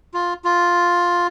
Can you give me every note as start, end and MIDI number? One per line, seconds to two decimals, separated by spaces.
0.14 0.34 65
0.44 1.27 65